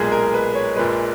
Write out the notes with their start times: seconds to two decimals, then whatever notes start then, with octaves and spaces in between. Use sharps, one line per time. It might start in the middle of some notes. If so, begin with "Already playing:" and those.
Already playing: B1 A#2 G#3 G#4
0.12 A#4
0.34 B4
0.55 C#5
0.76 A#1 A#2 G#3 B4